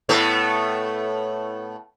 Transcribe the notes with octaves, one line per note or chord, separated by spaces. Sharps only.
A2 A3 B3